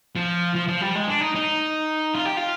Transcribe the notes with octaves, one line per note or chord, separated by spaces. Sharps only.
F3
F3
F3
G3
G#3
D4
D#4
D#4
F4
G4
F4